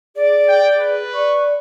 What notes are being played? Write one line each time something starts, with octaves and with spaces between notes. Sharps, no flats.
G#4 D5
G5
G#4 B4
D5 C#6